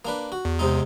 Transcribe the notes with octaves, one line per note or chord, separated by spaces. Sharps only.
A#3 D4 B4
F#4
E2
C3 G#3 D#4